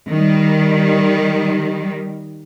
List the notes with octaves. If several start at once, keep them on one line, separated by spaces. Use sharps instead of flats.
D#3 G3